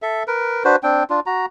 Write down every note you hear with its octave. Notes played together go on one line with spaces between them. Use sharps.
A4 E5
A#4 B4
D4 F#4 B4 C5
C4 D4 G5
D4 F4
F#4 A#5